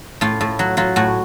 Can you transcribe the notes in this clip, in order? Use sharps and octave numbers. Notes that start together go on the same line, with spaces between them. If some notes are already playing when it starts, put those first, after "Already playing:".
A2 F4
A2
F#3
F#3 F4
A2 F#4